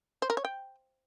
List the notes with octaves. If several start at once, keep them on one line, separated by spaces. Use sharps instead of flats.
C5
A#4
C#5
G5